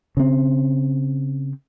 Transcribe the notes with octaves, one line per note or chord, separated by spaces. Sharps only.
C#3 C4